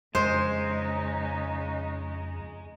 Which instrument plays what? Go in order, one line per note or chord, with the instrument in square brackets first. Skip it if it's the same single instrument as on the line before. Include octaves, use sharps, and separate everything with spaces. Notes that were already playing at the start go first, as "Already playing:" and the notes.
[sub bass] F2 [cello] C#3 D#4 [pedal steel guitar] G#3 [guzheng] C5